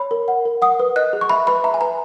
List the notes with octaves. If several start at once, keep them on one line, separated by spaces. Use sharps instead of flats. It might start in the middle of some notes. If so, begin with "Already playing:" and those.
Already playing: C#5 B5
A#4
F#5
A#4
F#5 D#6
B4
D#5 F#6
G#4
C#6
E5 B5
B4 B5
E5 A#5
G#5
B4 A#5